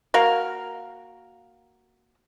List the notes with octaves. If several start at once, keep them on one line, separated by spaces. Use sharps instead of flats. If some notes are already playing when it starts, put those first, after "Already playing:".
A#3 F#4 A#4 F5